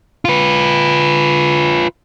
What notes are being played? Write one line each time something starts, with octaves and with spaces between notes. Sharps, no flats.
F4 B4